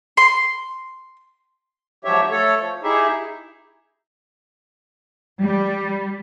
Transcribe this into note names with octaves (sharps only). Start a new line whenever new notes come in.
C6
G#2 F3 F#3 G4 C#5 E5
A3 A4 C#5
F3
D#4 E4 G4 G#4 E5
G3